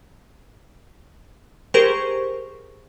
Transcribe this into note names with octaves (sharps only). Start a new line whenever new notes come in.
G4 G#4 A#4 C5 C#6